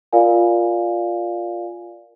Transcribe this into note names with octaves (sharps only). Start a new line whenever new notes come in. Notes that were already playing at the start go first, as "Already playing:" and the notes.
F4 A#4 D5 F5 G#5